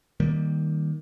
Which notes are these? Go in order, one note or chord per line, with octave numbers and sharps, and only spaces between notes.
D#3 G3 A#3